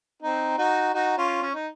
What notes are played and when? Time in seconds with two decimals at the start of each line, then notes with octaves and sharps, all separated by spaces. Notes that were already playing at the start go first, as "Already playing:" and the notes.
0.22 C4 D#4
0.58 D#4 F#4
0.94 D#4 F#4
1.18 C#4 F4
1.42 C#4
1.54 D#4